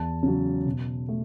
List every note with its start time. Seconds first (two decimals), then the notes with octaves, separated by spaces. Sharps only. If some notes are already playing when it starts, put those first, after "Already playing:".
Already playing: E2 A5
0.23 C#3 F#3
0.66 B2
1.09 A3